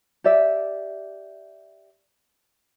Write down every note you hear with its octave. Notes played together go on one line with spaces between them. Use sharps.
G4 D5 E5